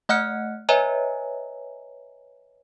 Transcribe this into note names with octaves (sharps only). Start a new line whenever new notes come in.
A3 D#5 F#5 F6 F#6 C#7
B4 C#5 D#5 E5 G#5 A#5